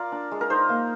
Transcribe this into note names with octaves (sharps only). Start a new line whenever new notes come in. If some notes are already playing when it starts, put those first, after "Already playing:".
Already playing: F4 A#4 D5
D4
G#3
A#4
D#4 C5
A#3